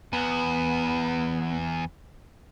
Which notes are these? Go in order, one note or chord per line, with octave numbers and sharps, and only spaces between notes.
E2 B3